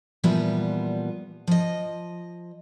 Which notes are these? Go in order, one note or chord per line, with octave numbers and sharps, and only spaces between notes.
A#2 E3 F3 G3 B3
F3 D#5